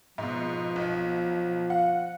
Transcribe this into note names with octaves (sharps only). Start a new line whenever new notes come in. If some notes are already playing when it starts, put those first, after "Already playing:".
G#2 B2 F3
B1
F5 F#5